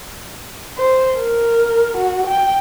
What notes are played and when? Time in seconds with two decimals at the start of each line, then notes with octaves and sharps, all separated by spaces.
0.78 C5
1.18 A#4
1.97 F#4
2.27 G5